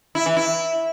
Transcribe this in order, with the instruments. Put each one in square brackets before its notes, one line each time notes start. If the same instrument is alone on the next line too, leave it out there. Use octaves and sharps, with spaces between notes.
[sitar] E4
E3
E4